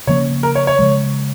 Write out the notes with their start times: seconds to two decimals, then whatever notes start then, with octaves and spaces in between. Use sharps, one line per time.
0.07 C#3 F3 A#3 C#4 C#5
0.43 A#4
0.55 C#5
0.67 C#5
0.79 C#3 F3 G#3